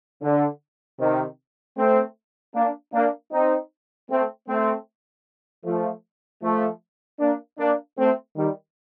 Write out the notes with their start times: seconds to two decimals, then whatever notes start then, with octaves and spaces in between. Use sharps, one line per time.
0.22 D3
1.00 C3 D#3
1.77 A3 C4
2.54 A#3 D4
2.94 A#3 D4
3.32 C4 D#4
4.10 A3 C4
4.48 A3 C4
5.65 F3 A3
6.42 F3 A3
7.20 A#3 D4
7.59 A#3 D4
7.98 A3 C4
8.36 D#3 G3